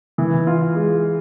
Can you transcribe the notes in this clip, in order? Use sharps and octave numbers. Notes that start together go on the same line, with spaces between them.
E3
F4
G#3